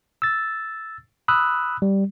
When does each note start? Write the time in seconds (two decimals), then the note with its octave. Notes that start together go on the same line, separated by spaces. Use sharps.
0.22 E6 A6
1.28 B5 D#6 E6 F#6
1.82 G3